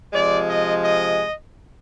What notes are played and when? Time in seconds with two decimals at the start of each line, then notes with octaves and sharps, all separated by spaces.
0.13 C3 F3 G#3 D5
0.47 D#5
0.83 D#5